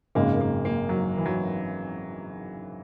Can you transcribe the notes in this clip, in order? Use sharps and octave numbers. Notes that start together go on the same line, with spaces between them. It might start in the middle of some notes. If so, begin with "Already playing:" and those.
G#1 F#2 C#3 G#3 A#3
A#3
A#3
F#3
E3
F#3